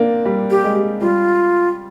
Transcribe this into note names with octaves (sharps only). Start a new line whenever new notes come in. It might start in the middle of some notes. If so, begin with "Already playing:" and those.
Already playing: A#3 C4 D4
G3
G4
G#3
G3 F4